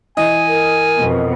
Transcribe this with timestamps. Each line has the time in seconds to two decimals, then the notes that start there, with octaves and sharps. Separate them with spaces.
0.17 E3 D#5 G#5
0.47 A#4
0.99 F2 B2